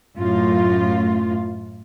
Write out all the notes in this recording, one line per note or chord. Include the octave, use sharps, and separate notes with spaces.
F#2 A2 F4